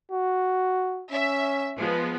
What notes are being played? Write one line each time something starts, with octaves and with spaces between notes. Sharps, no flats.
F#4
C#4 E5
F3 G#3 B3